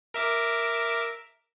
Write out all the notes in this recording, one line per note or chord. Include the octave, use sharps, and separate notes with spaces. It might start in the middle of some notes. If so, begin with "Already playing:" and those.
A#4 E5 D6